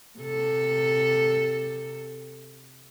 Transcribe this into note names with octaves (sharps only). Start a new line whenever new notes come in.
C3 A4